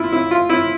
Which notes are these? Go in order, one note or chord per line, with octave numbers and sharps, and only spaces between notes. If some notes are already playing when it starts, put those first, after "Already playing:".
Already playing: E4 F4
E4
F4
E4